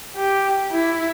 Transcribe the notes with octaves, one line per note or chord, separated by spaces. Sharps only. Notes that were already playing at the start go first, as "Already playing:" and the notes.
G4
E4